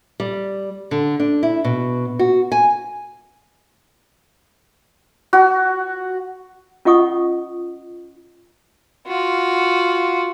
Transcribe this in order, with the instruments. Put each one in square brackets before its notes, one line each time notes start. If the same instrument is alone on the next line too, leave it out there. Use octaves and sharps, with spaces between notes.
[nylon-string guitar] G3
D3
D4
E4
B2
F#4
G#5
[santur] F#4
[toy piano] C#4 F4 D#5 F#5 C#6 D#6
[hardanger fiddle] F4 F#4